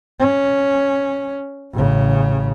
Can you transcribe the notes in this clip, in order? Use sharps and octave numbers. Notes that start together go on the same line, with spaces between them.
C#4
A1 C#3